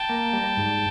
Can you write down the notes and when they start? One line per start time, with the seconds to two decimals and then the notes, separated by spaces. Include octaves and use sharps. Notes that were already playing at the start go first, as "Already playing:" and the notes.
Already playing: G5 A5
0.09 A#3
0.33 G3
0.57 G#2